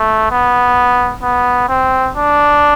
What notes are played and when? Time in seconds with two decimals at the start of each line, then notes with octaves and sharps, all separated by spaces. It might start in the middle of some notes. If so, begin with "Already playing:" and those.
Already playing: A3
0.31 B3
1.23 B3
1.69 C4
2.16 D4